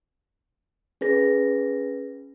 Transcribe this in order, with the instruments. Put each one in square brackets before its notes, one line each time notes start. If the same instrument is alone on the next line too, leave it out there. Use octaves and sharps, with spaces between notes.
[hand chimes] C#4 G#4 B4 A#6